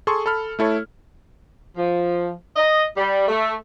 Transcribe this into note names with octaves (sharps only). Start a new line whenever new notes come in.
G#4 A4 C6 C#6
A4 B5 F6
A3 E4 A4 C#5
F3
D#5
G3
A3